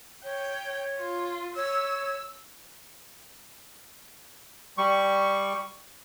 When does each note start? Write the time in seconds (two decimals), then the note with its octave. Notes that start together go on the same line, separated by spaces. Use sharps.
0.24 C#5 G5
0.98 F4
1.56 C#5 E6
4.78 G3 C#6